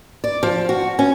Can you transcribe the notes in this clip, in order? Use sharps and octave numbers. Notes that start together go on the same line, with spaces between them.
D5
F3
F#4
C#4